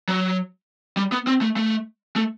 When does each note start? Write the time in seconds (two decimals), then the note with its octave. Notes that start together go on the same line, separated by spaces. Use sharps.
0.09 F#3
0.97 G3
1.12 B3
1.27 C4
1.41 A3
1.56 A3
2.16 A3